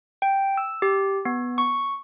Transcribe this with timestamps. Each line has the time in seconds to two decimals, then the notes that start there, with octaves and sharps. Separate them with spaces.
0.22 G5
0.57 E6
0.82 G4
1.25 B3
1.58 C#6